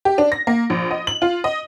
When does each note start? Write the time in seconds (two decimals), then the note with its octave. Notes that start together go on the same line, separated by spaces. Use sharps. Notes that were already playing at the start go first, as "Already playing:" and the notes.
0.05 G4
0.18 D4
0.32 A#6
0.47 A#3
0.70 A#1
0.91 D#5
1.07 F#7
1.22 F4
1.44 D#5